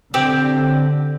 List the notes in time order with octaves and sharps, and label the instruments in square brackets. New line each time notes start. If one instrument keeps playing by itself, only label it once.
[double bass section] D3 [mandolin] C4 G4